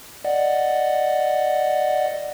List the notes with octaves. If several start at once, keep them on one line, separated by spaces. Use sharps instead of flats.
D5 D#5 F#5